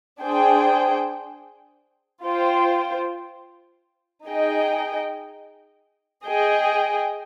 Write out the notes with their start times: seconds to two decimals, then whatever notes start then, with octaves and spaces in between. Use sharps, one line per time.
0.22 D4 G#4 C5 G5
2.24 F4 C5 G5
4.25 D#4 G#4 D#5 G5
6.27 G#4 D#5 G5